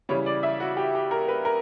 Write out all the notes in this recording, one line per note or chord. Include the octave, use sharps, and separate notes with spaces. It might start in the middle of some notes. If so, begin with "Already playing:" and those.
C#3 E3 G3 C#5
D5
E5
F#4
G4
G4
A#4
B4
A#4